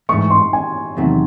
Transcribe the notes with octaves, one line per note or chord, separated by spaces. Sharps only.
G#2 E3 A3 C#6
C6
G#5
E2 C3 D#3 F#3 A3